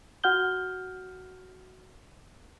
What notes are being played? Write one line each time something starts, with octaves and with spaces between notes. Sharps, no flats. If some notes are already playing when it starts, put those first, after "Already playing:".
F#4 F#5 F6 G6 G7